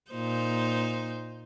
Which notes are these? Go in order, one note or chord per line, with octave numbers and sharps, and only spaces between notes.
A#2 D#4 C5